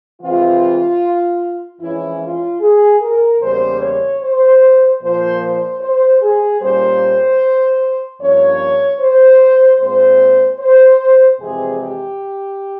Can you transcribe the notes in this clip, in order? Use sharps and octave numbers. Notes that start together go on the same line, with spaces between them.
C3 E3 G#3 C4 F4
F2 E3 G#3 C#4 E4
F4
G#4
A#4
E2 C#3 G3 A#3 C#4 C5
C#5
C5
A#2 F3 A#3 C5
C5
C5
G#4
A#2 G3 A#3 C#4 C5
G2 F3 A#3 C#4 C#5
C5
A#2 G#3 C4 C5
C5
F2 C3 E3 G#3 C4 G#4
G4